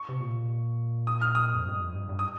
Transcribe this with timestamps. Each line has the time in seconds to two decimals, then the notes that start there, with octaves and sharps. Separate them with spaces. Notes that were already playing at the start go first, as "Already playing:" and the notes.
Already playing: C#6
0.09 C3
0.20 A#2
1.07 D#6
1.21 F6
1.35 D#6
1.54 F2
1.66 G2
1.79 F2
1.94 G2
2.09 G2
2.19 D#6